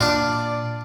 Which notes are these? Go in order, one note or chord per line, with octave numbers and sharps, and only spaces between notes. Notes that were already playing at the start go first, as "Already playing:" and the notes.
A#2 D4 F4 D5